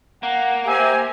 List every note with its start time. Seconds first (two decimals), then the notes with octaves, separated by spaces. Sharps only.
0.23 A#3 F#5
0.67 G4 C5 E5 G#5